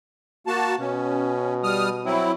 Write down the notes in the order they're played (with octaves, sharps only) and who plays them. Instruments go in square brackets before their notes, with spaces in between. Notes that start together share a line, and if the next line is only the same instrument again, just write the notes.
[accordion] A#3 F#4 A5
[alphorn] B2 [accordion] C#4
[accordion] G3 D#6 F6
F#3 C4 E4